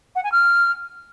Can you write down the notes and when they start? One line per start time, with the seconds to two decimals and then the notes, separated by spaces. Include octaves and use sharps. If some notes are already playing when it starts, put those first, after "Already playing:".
0.15 F#5
0.24 G#5
0.32 F6